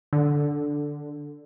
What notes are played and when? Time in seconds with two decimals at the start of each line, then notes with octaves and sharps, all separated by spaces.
0.13 D3